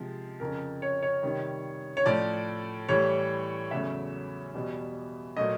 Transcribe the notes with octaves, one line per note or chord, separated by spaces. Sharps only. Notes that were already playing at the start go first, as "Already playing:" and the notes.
Already playing: C3 F3 G#3
F2 C#3 F3 A#4
C#5
C#5
C3 D#3 G3
C#5
A2 F3 A3 D5
A2 E3 G3 C#5
E2 C#3 F#3 A3 E5
E2 B2 G3
A#2 F#3 A3 D#5